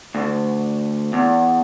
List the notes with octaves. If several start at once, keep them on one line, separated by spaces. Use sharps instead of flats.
D2
E2